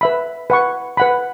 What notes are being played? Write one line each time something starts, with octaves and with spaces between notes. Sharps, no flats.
B4 E5 B5
B4 F#5 C#6
B4 F#5 B5